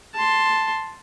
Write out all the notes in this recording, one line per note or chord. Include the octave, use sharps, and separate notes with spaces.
A5 C6